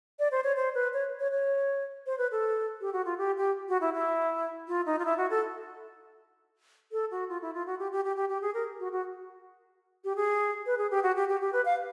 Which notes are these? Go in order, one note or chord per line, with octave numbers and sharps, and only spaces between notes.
D5
C5
C#5
C5
B4
C#5
C#5
C#5
C5
B4
A4
G4
F#4
F4
G4
G4
F#4
E4
E4
F4
D#4
F4
E4
F#4
A4
A4
F#4
F4
E4
F4
F#4
G4
G4
G4
G4
G4
G#4
A#4
F#4
F#4
G4
G#4
B4
G#4
G4
F#4
G4
G4
G4
B4
F5